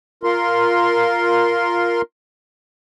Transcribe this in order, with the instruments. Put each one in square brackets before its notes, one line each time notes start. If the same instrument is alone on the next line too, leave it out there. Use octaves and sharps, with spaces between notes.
[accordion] F4 A#4 C6